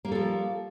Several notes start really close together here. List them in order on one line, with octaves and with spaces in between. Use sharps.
A#3 G3 A4 F3